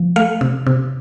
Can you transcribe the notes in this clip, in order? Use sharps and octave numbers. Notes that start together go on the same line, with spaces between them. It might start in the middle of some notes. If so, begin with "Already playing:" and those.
Already playing: F3
A3 F5
C3
C3